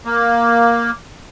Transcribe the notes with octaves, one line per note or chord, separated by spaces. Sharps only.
A#3